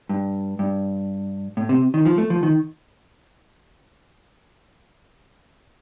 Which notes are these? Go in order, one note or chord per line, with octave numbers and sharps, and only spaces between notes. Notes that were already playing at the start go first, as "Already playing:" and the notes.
G2
G2
A2
C3
D#3
F3
A3
F3
D#3